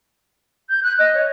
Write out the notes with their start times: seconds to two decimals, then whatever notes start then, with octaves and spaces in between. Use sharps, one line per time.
0.69 G6
0.83 F#6
0.99 D#5
1.14 C#5